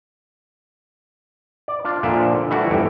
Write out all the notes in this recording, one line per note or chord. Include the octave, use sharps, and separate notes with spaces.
D5
D4 F4
A#2 D3 F3 D4 E5
E3 G3 A3 E4 F#4
G1 A2 E3 G5